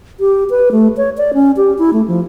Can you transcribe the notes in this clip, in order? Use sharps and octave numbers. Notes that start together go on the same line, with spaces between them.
G4
B4
A3
C#5
D5
C#4
G4
E4
A3
F3